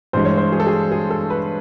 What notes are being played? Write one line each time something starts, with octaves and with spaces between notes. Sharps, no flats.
G2 E3 G#3 C5
C#5
C5
G#4
A4
G#4
G#4
A4
B4